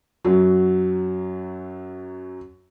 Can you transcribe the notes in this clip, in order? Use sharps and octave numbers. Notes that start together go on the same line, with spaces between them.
F#2 F#3